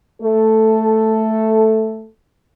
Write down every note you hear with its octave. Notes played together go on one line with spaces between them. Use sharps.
A3 A4